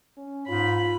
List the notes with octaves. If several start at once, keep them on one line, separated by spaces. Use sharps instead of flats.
C#4
G#2 F4 B5